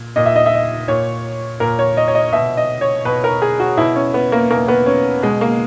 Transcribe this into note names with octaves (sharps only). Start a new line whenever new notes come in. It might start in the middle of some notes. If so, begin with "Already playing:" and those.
Already playing: A#2
A#2 D#5
E5
D#5
E5
D#5
A#2 C#5
A#2 A#4
C#5
D#5
C#5
D#5
B2 E5
D#5
C#5
B2 B4
A#4
G#4
F#4
B2 E4
C#4
B3
A#3
B2 A#3
B3
C#4
B2 G#3
A#3